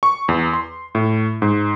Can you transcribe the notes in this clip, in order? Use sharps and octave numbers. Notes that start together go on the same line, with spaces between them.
C#6
E2
C6
A2
G#2